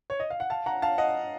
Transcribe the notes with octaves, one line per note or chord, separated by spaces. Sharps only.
C#5
D#5
F5
F#5
F5 A5
F#5 A#5
F5 A5
D#5 F#5